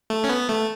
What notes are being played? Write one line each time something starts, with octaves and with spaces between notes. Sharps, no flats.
A3
C#4
B3
A3